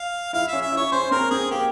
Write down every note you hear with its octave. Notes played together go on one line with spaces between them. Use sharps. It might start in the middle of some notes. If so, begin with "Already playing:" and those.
Already playing: F5
E4 F5
E5
C#4
E5
E4 C#5
C#4 C5
C4 A#4
C4 G#4
A#3 G4